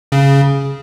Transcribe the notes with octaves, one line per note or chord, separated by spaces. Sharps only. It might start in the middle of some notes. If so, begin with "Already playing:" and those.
C#3